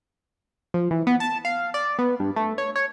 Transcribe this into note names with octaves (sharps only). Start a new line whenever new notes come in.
F3
E3
B3
A5
F5
D5
B3
G2
A3
C#5
C#5